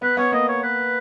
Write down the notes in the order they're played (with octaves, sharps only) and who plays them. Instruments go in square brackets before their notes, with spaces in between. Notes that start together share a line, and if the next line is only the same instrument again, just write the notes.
[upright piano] B3 [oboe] B4
[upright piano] B3 [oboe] C#5
[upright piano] A#3 [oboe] D#5
[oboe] C#5
B4